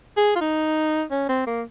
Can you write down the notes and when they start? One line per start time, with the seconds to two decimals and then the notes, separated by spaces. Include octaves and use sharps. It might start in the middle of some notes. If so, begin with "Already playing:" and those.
0.17 G#4
0.36 F4
0.41 D#4
1.11 C#4
1.29 C4
1.47 A#3